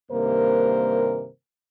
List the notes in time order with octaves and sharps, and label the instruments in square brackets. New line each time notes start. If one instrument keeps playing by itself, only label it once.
[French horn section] G2 C3 D#3 A#3 A#4 C5